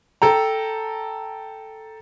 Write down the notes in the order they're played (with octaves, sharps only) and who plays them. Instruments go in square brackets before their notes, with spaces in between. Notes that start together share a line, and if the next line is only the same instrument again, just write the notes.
[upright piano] A4 G5 A#5